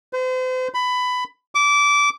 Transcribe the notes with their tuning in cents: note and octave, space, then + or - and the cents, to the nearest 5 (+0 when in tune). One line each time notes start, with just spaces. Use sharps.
C5 -40
B5 +15
D6 -20